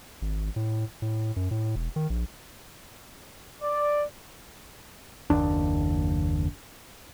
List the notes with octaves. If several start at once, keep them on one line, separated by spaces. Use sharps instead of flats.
G#1
A2
A2
F#2
A2
E1
D#3
A#1
D5
F#1 D#2 D4